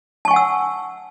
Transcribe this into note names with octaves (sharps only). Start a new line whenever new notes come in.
F#5 G#5 A5 C#6 E6